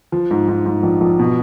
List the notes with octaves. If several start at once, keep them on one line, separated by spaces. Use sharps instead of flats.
F3
G#2
G#2
G#2
A#1
A#1
B2